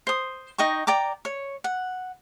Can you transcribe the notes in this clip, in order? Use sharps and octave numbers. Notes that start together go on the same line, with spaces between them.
C5 D#6
D#4 D#5 G5 C#6
D5 G5 A#5 D6
C#5
F#5